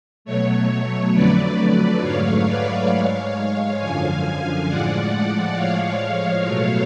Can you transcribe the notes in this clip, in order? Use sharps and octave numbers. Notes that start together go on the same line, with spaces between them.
B2 F#3 A3 C#5
C#5
F2 D3 F#3 A3 B4 D5
G#2 F#3 A3 C#5 F5
B4 D5
G#2 G#3 C#5 F5
F#2 D3 F3 F5 G#5
A2 F3 G#3 D5 F#5
A2 F3 G#3 C#5 F5
B2 F#3 A3